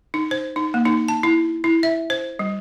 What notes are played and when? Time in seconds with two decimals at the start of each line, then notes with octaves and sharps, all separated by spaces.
0.14 D#4
0.31 C5
0.56 D#4
0.74 A#3
0.86 D#4
1.08 A5
1.23 E4
1.64 E4
1.83 E5
2.10 C5
2.39 G3